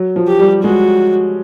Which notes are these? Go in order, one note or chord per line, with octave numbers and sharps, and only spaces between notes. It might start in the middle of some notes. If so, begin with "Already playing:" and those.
Already playing: F#3
F3
G4
G3
G#3 F#4